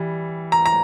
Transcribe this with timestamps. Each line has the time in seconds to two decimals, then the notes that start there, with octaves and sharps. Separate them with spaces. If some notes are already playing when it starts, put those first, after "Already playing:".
Already playing: E3 G3
0.52 A#5
0.66 A#5